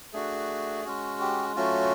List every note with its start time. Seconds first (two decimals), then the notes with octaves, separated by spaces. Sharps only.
0.13 A3 D4 F#4 G#4
0.85 G#3 C#4 F#4
1.20 G4
1.56 F#3 A3 C#4 F4 F#4